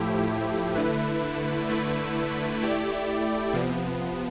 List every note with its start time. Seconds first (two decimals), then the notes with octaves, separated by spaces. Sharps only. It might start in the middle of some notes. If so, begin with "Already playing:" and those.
Already playing: A2 F3 A3 E4 G4
0.75 D3 A3 E4 B4
1.68 D3 A3 E4 B4
2.61 A3 E4 G4 D5
3.53 C3 F3 B3